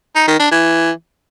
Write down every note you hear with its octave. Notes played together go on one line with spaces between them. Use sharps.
D#4
D#3
D4
E3